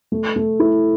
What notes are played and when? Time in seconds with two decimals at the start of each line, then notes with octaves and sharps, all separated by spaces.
0.12 A3
0.36 A3
0.60 E4